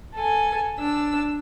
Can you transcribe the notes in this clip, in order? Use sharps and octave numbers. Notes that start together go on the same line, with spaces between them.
A4 G#5
D4 E6